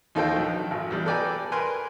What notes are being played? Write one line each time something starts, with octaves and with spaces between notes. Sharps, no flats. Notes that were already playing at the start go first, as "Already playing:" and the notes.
D#2 D#4 F4 A4 C5 G5
A#1 F#3
G#1
E2 G3
A4 B4 D5 G5 G#5 A#5
A#4 B4 G#5 C6